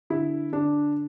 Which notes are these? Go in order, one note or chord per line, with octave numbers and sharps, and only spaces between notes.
D3 E4
D3 D4